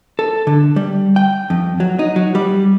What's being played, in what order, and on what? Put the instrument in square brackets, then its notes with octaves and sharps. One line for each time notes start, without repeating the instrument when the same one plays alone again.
[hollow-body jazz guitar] A4
D3
G3
G5
F2
F#3
D#4
F#3
G3